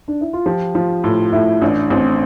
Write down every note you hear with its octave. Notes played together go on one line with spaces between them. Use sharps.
D4
E4
F4
F3 G4
F3 F4
A2 F4
A2 E4
A1 D4
A1 C4